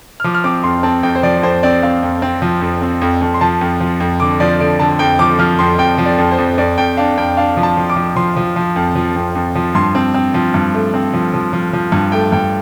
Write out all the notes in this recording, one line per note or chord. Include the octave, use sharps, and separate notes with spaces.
F6
F3 D6
F6
C4 D6
F2 C6
C4 A5
F2 G5
C5
F3 D5
F2 C5
C4 D5
C4 F5
F2
C4
F3
F2
C4
F2
F2
C6
F3 A5
F2
F3
F2
D3 D6
F3 D5
D3 D5
D3 A5
F2 G5
F3 D6
F3 F6
F2 C6
F2 G5
F3
D5
F2
C5
F2
F2 D5
F2 G5
D4 F5
F2 G5
D4 F5
F3
A5
F3
D6
F3
F3 C6
F3
F3
F2
F3
F2
F2
F3
G2 C6
C4
C4
F3
G2
A3
C4
F3
F3
F3
F3
G2
A3 G5
G2 G5